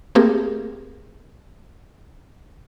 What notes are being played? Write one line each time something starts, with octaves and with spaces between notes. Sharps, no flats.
A3 A#3 C4 G4 G#4 A#4